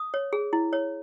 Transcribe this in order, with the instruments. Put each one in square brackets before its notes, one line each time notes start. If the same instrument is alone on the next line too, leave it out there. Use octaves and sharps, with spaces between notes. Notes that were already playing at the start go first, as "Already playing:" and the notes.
Already playing: [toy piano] D#6
C#5
G#4
E4
C#5